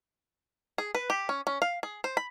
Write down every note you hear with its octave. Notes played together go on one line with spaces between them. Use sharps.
G#4
B4
G4
C#4
C#4
F5
G#4
C5
B5